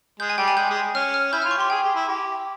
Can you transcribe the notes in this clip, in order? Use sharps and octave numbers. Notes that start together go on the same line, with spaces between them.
G#3 G6
G#5
G3 G5
G#5
G#3 G6
G#3
C#4 F6
F6
E4 G6
F4 F6
C#6
G4 C6
G#4 G5
G4
E4
G4